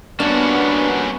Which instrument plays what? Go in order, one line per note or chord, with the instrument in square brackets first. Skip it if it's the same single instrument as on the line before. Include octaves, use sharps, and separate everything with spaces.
[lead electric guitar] G3 C#4 [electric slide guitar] A#3 F#4 [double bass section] B3 [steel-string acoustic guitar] D4